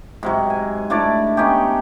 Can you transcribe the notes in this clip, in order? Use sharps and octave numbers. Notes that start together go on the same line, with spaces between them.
G#2 C3 F#3
G#5
D3 A3 E4 D5
B3 C#4 D#4 G4